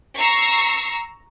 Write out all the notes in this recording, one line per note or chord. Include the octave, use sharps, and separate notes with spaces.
A#5 C#6 E6 C7